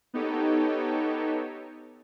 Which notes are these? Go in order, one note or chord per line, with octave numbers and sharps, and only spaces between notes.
B3 D#4 G4 A4 C#5